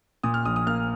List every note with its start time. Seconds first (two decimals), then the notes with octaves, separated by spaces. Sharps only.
0.23 A#2 D#6
0.34 F6
0.45 A#1 D#6
0.56 D#6
0.67 A#3 F6